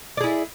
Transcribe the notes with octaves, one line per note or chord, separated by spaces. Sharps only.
E4 G#4 D5